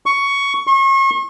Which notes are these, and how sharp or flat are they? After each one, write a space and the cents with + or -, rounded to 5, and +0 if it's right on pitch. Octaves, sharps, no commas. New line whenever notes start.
C#6 +10
C#6 -40